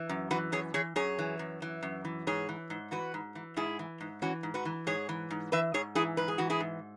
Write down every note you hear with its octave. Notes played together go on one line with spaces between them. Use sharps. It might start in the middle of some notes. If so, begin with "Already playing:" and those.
Already playing: E3
F#2
E3 F#4 B4
F#2 G#4 C#5
E3 G#4 C#5
F#2 G#4 C#5
E3
F#2
E3
F#2
E3
G#2 G#4 C#5
E3
G#2
E3 F#4 B4
G#2
E3
G#2 E4 G#4
E3
G#2
E3 C#4 F#4
G#2
F#4 B4
E3
G#2 G#4 C#5
E3
G#2
E3 B4 E5
G#2 G#4 C#5
E3 E4 G#4
G#2 B4
G#4
E3 F#4
E4 G#4
G#2